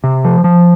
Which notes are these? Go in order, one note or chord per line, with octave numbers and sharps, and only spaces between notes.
C3
F3
F3